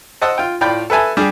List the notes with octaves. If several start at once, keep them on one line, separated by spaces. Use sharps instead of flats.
C5 D#5 F#5 A5 D#6 E6
F4 G5
A2 F4 D5 G5 B5
A4 B4 E5 G#5 A5
G3 D4 G4 G#4